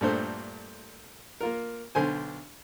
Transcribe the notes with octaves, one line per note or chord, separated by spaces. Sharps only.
G2 A#2 A3 C5
A#3 F4 A#4
B1 D3 C5 G#5